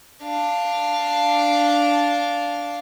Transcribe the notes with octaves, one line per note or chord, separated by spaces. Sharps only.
D4 F5